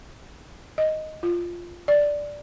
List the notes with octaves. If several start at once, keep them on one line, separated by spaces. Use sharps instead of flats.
D#5
F4
D5